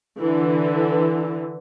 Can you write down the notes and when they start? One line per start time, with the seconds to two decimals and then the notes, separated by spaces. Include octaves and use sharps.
0.20 D3 E3